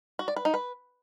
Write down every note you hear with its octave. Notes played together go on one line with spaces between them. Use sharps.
F#4
D5
B4
D#4
B4